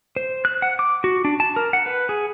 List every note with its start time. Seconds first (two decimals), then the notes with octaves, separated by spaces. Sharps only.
0.16 C5
0.45 F#6
0.62 F#5
0.79 D6
1.04 F#4
1.25 D4
1.40 A5
1.56 A#4
1.73 F#5
1.86 B4
2.09 G#4